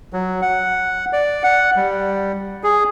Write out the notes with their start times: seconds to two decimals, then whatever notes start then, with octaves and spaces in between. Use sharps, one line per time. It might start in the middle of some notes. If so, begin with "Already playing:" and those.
0.13 F#3
0.42 F#5
1.13 D5
1.43 F#5
1.76 G3
2.63 G#4